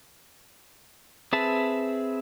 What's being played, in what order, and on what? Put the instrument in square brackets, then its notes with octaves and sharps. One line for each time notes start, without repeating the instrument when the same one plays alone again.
[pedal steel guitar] C4 G#4 B4 E5 A5